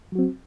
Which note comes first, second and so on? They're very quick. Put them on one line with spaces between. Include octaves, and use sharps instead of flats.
F#3 F#4 C4